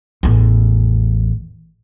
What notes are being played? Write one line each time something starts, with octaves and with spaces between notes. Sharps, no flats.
A1 E2